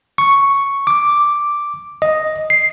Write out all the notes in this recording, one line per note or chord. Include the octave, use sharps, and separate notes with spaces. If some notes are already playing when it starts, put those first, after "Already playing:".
C#6
D6
D#5
C7